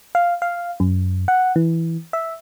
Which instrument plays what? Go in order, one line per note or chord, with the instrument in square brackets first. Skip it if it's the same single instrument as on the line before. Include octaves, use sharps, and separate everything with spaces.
[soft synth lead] F5
F5
F#2
F#5
E3
E5